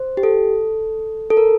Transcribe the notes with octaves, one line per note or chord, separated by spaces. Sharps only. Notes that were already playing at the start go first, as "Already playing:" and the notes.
Already playing: C5
G4
A4
A4
A#4